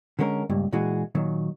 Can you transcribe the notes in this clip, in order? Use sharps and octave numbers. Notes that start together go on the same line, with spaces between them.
D3 G#3 C#4 A#4
C#2 G2 A#2
A#2 E3 G#3 F#4 G#4
A#2 D#3 F#3